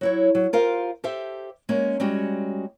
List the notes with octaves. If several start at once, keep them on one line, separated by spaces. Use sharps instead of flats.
F#3 E4 C#5
F#3
F4 G4 A#4 C5 F5
G4 A4 C5 E5
G#3 A#3 C#4
G3 G#3 C#4 F#4 G4